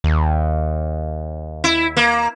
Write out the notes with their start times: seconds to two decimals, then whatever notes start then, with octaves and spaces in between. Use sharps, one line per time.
0.04 D#2
1.64 E4
1.97 A#3